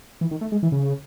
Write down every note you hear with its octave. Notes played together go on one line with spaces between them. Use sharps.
E3
D#3
A3
G#3
E3
C#3